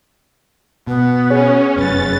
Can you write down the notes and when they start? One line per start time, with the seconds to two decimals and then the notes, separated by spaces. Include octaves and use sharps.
0.87 B2 B3
1.30 C#4 G#4 C#5
1.77 F1 F#2 B4 A6